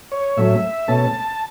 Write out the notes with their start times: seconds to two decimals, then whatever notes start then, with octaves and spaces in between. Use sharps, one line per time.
0.12 C#5
0.37 A2 F#3 A3 C#4 E5
0.88 B2 A3 C#4 A5